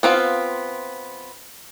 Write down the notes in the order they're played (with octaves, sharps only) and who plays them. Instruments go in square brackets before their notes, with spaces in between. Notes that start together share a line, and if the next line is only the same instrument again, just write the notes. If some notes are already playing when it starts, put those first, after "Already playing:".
[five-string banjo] B3 C4 F4 F5